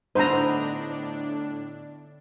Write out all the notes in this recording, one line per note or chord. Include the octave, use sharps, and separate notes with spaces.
A2 D3 B3 D4 D#4 C5 A#5